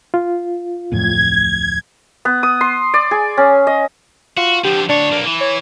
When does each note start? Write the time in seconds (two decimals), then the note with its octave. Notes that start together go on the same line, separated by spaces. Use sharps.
0.14 F4
0.92 D1 F2 A2 G#6
2.25 B3
2.43 D#6
2.61 C6
2.94 D5
3.11 G#4
3.37 C#4
3.67 D#5
4.37 F4 F#4
4.64 D3 F3 G4
4.89 D2 D4 C#5
5.11 B1 A#3
5.25 E3
5.41 C#5